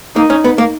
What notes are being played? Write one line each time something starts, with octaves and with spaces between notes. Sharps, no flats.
A#3 D#4
C#4
B3
A#3